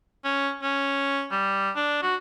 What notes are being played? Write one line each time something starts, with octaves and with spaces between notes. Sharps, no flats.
C#4
C#4
G3
D4
F#4